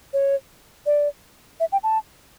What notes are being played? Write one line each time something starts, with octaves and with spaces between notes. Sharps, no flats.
C#5
D5
E5
G5
A5